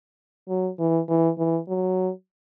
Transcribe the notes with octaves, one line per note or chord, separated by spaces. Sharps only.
F#3
E3
E3
E3
F#3